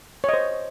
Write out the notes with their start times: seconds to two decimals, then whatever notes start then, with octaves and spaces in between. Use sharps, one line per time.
0.24 C#5
0.29 D#5
0.33 C5